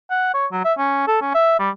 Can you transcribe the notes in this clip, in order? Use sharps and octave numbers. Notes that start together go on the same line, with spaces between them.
F#5
C#5
F#3
E5
C#4
A4
C#4
E5
G3